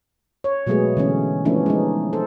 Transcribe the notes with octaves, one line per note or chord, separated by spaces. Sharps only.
C#5
B2 F#3 G#3 A3 B3 G#4
D3 E3 C#4
F3 A3 B3 C#4 D4 E4
G#3 B3 D#4
A4 C5